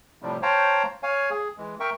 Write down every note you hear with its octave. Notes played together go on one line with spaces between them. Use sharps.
A2 C3 F3 G3
C5 C#5 F5 G5 A5 A#5
C#5 F5 G#5
G#4
E3 G#3
A#4 E5 G5 C#6